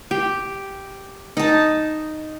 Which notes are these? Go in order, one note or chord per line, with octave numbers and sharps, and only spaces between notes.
G4
D#4 A5